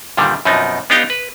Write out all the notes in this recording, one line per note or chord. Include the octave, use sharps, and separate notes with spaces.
G2 A#2 D3 D#3 G3
F#2 B2 F3 B3 C4 D#4
B3 D4 D#4 G4 F5 G5
B4